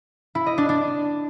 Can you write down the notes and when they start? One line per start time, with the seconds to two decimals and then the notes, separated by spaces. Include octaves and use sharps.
0.35 E4
0.46 D#5
0.58 D4
0.69 D4